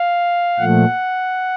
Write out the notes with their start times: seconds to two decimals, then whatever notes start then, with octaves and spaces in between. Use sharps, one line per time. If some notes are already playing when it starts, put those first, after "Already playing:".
Already playing: F5
0.59 A#2 F3 A3 F#5